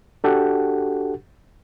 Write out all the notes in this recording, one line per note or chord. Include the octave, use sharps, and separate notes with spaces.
D4 F#4 G4 A4 F#5